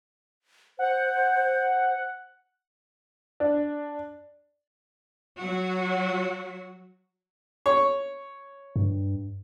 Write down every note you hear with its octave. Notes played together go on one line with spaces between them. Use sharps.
C5 F#5
D4
F#3 F#4
C#5
G2